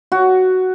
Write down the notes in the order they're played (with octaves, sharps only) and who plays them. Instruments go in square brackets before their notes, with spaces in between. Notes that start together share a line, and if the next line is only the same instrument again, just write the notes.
[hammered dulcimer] F#4